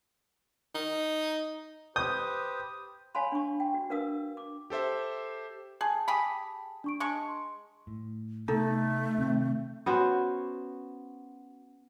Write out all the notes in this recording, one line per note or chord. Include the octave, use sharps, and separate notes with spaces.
D#4
G4 B4 C5 D#6 G6
C#5 F5 G#5 A5 B5 C6
D4 C#6
G5
F#4
D4 A#4 B4 F5 D#6
D6
G4 A4 C5 E5
G#4 G5 A5
G4 G#4 B5
D4 C#6 D7
G#3 A5 C#6
C6
A2
C3 A3 B3 D#4 A4
C3 D#3 C4
B3 C#4 F#4 C5